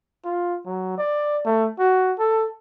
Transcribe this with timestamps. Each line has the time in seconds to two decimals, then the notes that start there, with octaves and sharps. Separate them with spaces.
0.25 F4
0.66 F#3
0.98 D5
1.46 A3
1.79 F#4
2.19 A4